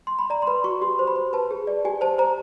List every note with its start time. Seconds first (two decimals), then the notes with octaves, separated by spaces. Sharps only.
0.07 C6
0.19 B5
0.30 D5 A#5
0.42 C6
0.47 B4 B5
0.64 F#4 C#6
0.82 G4 C6
0.99 C5
1.07 B5
1.16 C5
1.33 B4 A5
1.51 G#4
1.67 D5
1.85 G4 G#5
2.01 C5 A5
2.18 C5 A#5